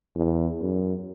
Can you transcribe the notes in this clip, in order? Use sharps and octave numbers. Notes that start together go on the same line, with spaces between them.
E2
F#2